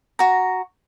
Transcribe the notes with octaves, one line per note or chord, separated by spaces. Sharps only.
F#4 A#5